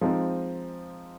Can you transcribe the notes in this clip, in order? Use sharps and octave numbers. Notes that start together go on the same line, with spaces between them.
F3 G#3 C4 D#4